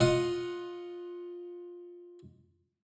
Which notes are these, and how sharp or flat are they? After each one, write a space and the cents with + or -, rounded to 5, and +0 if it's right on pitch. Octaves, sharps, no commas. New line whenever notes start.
F4 +10 D#5 +0 F#5 +0